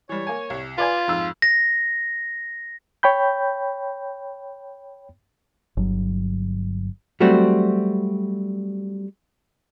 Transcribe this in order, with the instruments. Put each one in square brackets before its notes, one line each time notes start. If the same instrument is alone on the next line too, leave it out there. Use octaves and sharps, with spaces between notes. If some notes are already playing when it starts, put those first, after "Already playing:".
[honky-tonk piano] E3 G3 [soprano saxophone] C#5
[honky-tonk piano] A#3 G#5
C2
[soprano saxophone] F4 [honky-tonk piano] B4 D5 G#5
[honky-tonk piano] F2 G#2 E6
[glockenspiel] A#6
[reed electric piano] C#5 G5 B5 G6
[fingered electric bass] G1 F#3
[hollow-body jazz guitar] F#3 G3 A3 C4 F#4